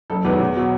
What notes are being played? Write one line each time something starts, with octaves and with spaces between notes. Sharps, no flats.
F#1 A4
E2 D#3 F#3 B4
E2
B2 F#3